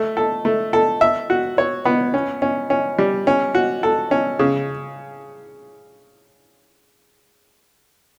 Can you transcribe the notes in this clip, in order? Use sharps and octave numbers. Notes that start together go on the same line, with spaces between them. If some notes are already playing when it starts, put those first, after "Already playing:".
Already playing: A3
A4
A3
A4
E5
F#4
C#5
B3
C#4
C#4
C#4
G3
C#4
F#4
A4
C#4
C#3